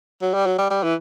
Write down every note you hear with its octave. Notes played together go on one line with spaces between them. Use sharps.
F#3
G3
F#3
G3
G3
E3